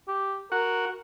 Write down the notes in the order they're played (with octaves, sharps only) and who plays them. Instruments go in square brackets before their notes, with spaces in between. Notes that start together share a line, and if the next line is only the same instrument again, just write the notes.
[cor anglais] G4
[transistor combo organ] F#4 [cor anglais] A#4